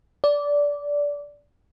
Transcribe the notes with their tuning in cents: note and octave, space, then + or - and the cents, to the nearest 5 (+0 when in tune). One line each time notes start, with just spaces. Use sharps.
D5 -15